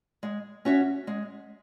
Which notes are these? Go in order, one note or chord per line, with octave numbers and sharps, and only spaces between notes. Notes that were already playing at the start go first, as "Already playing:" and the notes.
G#3
C#4 F#4 E5
G#3